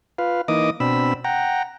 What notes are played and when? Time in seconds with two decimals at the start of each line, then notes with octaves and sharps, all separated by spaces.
0.18 F4 B4 F5
0.48 E3 A#3 D#4 D#5 D6 D#6
0.80 B2 C4 D4 B5 E6
1.24 F#5 G5 A#5